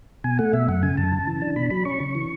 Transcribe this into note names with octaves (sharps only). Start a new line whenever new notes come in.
B2 G#5
A3 F#5
B2 E5
F#2 F#5
C#3 G#5
F#2 A5
C#3
E3
D4
B2 B5
F#3 B5
C#4 C#6
C#3
E3